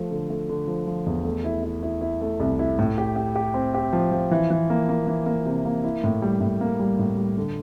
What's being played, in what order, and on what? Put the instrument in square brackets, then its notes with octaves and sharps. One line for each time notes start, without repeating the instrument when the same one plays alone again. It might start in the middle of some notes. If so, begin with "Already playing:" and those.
Already playing: [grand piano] F3 A3
D3
A3
D3
F3
F3
E2
A3
E4
E4
E4
E4
A3
C2
E4
A2
G4
G4
G4
C4
G4
F3
F3
E3
E3
A#3
A#3
E3
A#3
C3
A#3
E4
A2
G3
A2
A#3
G3
A2
G3
D3